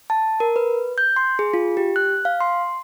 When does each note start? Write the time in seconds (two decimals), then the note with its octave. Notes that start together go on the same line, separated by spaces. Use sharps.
0.10 A5
0.40 A#4
0.56 B4
0.98 G6
1.16 C6
1.39 G#4
1.54 F4
1.77 G4
1.96 F#6
2.25 F5
2.40 C6